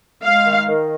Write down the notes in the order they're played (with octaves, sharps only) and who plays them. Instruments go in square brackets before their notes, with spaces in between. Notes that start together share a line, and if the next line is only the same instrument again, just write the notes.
[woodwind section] G#3 [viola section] F5
[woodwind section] D#3
D#3